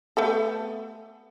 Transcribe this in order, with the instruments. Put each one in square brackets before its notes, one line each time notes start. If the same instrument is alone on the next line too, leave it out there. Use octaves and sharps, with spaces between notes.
[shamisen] A3 B3 A4